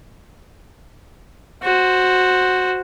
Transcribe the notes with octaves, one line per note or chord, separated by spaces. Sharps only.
F#4 C5